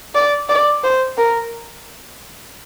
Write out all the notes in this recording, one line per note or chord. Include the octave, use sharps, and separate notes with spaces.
D5
D5
C5
A#4